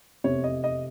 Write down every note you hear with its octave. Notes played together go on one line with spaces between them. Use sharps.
F1 E2 C3 C#5
D#5
D#5